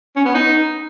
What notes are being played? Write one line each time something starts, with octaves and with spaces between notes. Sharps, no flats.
C#4
B3
D#4